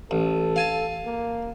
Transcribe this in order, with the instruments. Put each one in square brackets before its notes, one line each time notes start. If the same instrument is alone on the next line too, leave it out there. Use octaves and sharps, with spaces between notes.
[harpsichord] A1 [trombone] A4
[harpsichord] F5 G#5 A5
[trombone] A#3